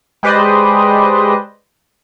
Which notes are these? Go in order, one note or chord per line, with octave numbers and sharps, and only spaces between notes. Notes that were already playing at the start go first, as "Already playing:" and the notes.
G#3 G4 B4 C5 D5 D#5